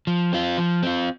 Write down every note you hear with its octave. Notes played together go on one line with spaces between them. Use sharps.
F3
C4 F4
F3
C4 F4